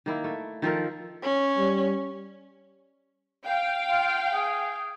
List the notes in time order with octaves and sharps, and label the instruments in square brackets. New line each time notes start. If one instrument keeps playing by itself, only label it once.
[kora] D#3 A#3 E4
A3
D#3 F3 A4 A#4
[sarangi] C#4
[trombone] G3
[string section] F5 G5
[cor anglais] F4
G#4